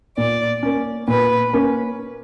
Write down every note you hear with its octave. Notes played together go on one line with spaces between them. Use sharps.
A#2 D5
A#3 C#4
A#2 B4
A#3 C#4